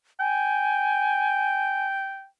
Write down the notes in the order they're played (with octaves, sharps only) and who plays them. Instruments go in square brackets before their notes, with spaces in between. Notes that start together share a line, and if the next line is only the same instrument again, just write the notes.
[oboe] G5 [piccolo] G#5